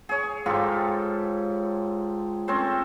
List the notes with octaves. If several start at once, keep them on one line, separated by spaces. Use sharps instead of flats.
G#4 C#5
G#2 F4 G4 A4
C4 C#4 A4 C5